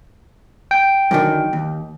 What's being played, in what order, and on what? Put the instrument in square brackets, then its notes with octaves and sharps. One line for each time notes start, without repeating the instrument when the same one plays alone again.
[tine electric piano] G5
[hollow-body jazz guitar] F#2 D3 D#3
D#2